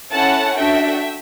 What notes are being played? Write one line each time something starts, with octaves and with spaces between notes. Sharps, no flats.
C#4 E4 A4 F#5 A5
D4 F#4 A4 E5 G5